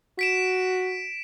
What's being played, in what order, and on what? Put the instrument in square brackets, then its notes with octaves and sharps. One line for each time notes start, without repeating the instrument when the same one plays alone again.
[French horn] F#4 [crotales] B6 D7 E7